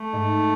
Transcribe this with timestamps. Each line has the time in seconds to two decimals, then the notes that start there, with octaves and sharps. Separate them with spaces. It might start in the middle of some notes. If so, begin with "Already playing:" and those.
Already playing: A3
0.13 G#2